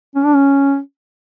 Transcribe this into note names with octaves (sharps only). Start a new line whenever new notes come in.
C#4
D4
C#4